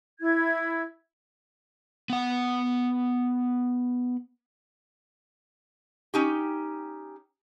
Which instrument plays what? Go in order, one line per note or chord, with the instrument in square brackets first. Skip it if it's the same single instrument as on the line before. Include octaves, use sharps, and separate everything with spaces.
[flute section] E4 G#6
[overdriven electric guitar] B3 F#5
[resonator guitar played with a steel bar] C#4 D#4 G4